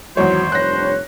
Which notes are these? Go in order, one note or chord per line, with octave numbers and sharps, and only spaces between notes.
G#1 E2 F#3 C5 C#5
F1 G2 C#5 F#6 A#6